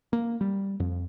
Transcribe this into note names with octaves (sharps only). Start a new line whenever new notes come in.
A#3
G3
F2